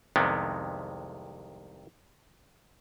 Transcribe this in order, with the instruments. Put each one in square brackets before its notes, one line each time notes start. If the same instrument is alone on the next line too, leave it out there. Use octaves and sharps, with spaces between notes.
[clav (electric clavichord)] C2 F2 C3 D#3 G#3 B3